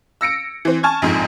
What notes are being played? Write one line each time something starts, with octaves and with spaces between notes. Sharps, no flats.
E6 A#6 C#7 D7
E3 C4
G#5 A5 C#6 F6 G#6
A#1 F2 G#2